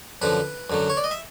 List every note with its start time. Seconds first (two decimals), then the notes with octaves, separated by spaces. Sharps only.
0.22 F#2 D3 F3 B4
0.70 F#2 D3 F#3
0.90 C#5
0.97 D5
1.04 D#5
1.11 E5